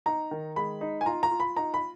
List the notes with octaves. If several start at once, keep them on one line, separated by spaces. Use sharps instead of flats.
D#4 A#5
D#3
G#3 B5
D#4
G#5
F4 A#5
A#5
F4
B5
D#4 A#5
B5